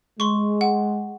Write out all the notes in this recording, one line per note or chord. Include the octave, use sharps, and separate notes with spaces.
G#3 C6 C#6
F#5